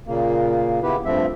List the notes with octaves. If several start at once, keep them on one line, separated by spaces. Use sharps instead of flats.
A#2 C#3 A#3
C#3 B3 E4 G4 B4
G2 F3 A3 C4 E5